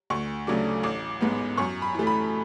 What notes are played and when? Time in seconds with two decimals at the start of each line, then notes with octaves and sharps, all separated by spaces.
0.10 D2 C#6
0.47 C#3 F#3 A3 D4 D6
0.83 A1 D6
1.21 G#2 G#3 B3
1.58 F#2 C#6
1.82 B5
1.95 E3 A3
2.07 B5